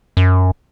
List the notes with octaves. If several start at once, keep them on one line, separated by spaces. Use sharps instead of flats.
F#2